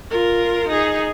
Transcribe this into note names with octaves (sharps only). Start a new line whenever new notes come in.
F4 A#4
D#4 G#4